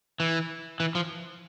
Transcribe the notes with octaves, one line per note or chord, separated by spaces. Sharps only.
E3
E3
F3